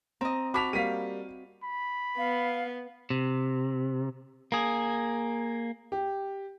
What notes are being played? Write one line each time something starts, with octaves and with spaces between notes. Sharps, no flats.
C4 D#5 A#5
F#4 A5 B5 D6 B6 F7
G3 A#3 F5 B6 D#7
B5
B3 F5
C3
A#3 G#4
G4